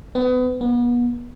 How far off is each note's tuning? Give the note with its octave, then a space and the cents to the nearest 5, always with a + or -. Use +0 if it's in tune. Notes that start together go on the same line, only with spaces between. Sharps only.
B3 +30
B3 -35